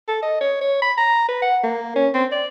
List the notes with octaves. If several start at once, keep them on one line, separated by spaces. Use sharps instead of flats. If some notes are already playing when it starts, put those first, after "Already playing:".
A4
D#5
C#5
C#5
B5
A#5
B4
F#5
A#3
C#4
C4
D5